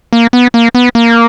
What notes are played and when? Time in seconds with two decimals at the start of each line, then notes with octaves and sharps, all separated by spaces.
0.13 A#3
0.33 B3
0.54 A#3
0.75 B3
0.95 A#3